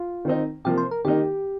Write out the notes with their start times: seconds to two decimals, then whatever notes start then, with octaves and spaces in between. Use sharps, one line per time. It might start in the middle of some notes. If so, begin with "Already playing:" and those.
Already playing: F4
0.25 D#3 C4 D#4
0.65 C3 F3 A#3 G4
0.78 C5
0.91 A#4
1.04 D#3 A#3 D#4 G4